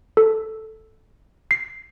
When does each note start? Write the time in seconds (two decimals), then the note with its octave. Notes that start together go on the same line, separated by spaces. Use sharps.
0.17 A4
1.51 C7